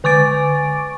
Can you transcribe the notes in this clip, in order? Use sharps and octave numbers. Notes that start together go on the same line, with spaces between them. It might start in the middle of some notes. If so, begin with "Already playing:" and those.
D3 G#5 C#6 D6 A6 D7